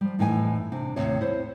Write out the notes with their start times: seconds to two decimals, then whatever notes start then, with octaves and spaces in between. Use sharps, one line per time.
0.01 F3 G3
0.19 F2 A2 E3 D#4 G5 G#5
0.72 C3 D4
0.96 D#2 A2 C3 C#5
1.21 E4 C5 C#5